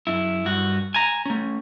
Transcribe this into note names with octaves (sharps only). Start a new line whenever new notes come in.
F#2 E4
G2 F#4
G#5 A#5
A3 C#4